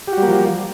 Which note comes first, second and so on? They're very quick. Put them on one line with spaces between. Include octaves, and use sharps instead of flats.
G4 F#4 G3 A#3 F3